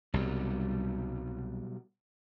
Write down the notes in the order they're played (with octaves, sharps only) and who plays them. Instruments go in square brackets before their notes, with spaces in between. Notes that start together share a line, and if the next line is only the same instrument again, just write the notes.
[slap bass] C2 [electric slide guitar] B2 F#3 G3